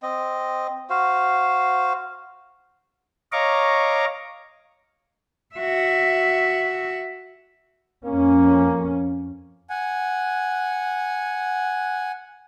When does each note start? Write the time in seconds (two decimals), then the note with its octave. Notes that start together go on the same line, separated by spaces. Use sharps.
0.03 C4 D#5
0.90 F#4 C5 F5
3.32 C#5 D#5 F5 A#5 C#6 D6
5.56 F#4 E5
8.06 F2 A#3 C#4
9.69 F#5 G#5